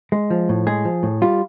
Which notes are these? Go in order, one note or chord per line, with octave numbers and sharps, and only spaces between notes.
G#3
F3
A2
G#3 G#4
F3
A2
G3 F4